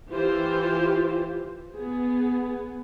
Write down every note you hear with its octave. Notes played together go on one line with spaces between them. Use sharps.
E3 F4 G4 C5
B3 G#4